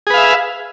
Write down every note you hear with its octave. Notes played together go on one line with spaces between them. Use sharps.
G#4 B4 E5 F5